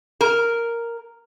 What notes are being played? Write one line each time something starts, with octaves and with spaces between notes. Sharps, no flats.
A#4